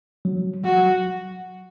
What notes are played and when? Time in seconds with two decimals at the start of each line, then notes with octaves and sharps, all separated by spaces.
0.25 F#3
0.64 F#3 F#4